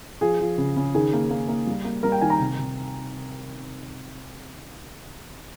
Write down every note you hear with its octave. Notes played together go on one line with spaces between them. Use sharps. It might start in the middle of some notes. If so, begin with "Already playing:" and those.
F3 G#4
F3
C#3
C#3
D#3 G#4
A#3
A#3
A#3
G3
A#3
G3 A#4
G5
D#3 G#5
A#5
C3
C3